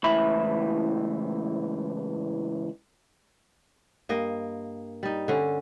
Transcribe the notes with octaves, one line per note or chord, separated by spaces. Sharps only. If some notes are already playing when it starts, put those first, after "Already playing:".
C#2 A2 E3 E5 B5
G2 A#3 D#5
G3 D#4
D3 C#4